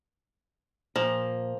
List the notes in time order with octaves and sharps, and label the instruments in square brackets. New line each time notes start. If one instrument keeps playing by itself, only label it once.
[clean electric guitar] A#2 [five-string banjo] F3 A#3